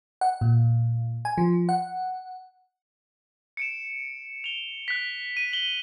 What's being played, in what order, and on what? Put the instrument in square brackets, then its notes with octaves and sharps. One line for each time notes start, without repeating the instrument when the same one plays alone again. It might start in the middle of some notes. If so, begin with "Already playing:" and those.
[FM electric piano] F#5
A#2
G#5
F3
F#5
[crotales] C#7 D7 E7
F7 G7
F#6 B6
D#7
F#7 G7